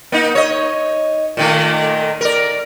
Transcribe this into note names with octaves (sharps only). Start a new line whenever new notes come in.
A#3 D#4
C#5 D#5
A#2 D#3 A3
A#4 D5